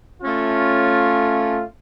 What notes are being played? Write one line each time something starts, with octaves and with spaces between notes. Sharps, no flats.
A3 C#4 F4